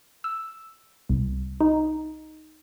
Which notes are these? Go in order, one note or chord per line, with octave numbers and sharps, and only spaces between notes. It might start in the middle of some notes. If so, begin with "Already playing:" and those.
E6
C2
D#4